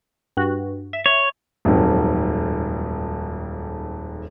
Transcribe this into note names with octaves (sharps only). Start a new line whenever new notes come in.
G2 F#4
E5
C#5
D#1 F2 G#2 F#3